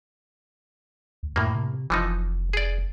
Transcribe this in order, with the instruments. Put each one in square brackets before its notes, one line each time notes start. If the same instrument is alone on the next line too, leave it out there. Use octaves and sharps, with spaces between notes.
[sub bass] D2
[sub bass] F#2 [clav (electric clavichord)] A2 A#3
[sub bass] C3
[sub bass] F1 [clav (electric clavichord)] E3 F3 D#4
[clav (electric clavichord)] G#4 D5